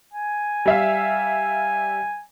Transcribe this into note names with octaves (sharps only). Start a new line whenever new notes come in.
G#5
G3 E5 F5